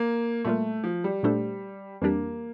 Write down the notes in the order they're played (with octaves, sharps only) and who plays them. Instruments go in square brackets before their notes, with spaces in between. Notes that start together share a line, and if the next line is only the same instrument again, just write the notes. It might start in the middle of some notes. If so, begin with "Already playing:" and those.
Already playing: [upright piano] A#3
[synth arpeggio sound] A#2 G3 A#3 F4 A#4 [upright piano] A3
[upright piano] F3
G3
[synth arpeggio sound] A#2 A3 D4 A4 C5 [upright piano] G3
[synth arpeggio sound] F2 E3 G3 D4 G4 [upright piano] A#3